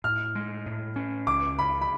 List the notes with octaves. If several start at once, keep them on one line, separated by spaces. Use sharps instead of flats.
A2 F6
G#3
A2
C#4
C#2 D6
C#3 B5
B5